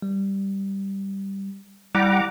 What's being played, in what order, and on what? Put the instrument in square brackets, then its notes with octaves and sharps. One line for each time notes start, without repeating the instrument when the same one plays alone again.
[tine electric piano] G3
[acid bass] G3 [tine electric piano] E4 [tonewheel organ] F#5 A#5 D6